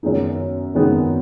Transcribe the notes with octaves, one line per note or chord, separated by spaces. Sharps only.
F#2 D#3 G#3 B3 D#4
F#2 D#3 G#3 B3 D#4